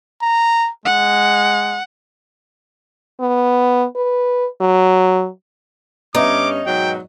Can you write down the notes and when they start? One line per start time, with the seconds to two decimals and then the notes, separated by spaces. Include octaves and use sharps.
0.22 A#5
0.86 G#3 F#5
3.20 B3
3.95 B4
4.61 F#3
6.15 G2 B3 C#4 D#4 D#5 E5 D6
6.66 G#2 B2 F#3 G5